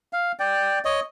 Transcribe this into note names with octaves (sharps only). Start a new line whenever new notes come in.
F5
D5 G5
C#5 D#5